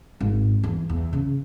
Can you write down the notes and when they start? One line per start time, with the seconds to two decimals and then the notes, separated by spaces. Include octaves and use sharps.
0.21 G#1
0.64 E2
0.89 E2
1.13 C#3